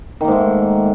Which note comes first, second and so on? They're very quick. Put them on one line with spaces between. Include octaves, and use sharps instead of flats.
D#3 A#3 G#2 A3